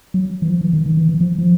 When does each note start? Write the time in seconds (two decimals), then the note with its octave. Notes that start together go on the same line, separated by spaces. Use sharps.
0.14 F#3
0.42 E3
0.49 F3
0.61 E3
0.73 D#3
0.86 D#3
0.97 E3
1.09 E3
1.21 F3
1.38 F3